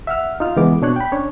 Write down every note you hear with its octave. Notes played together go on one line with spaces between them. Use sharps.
E5 F#5 F6
D#4 F4 F6
C#2 E3 G#3 B3 D6
B2 D4 C#5 F#6
G5 B5
C#4 D4 C#5